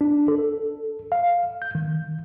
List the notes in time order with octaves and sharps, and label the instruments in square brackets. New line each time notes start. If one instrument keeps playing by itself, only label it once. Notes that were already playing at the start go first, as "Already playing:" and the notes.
[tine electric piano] D4
A4
F5
G6
D#3